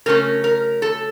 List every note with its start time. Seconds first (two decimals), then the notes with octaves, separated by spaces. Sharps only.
0.06 C#3 F#3 A3 C#4 A#4
0.44 A#4
0.82 A4